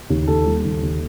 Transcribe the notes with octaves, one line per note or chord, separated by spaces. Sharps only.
D#2
D#2 A4
G3
D#2
D#2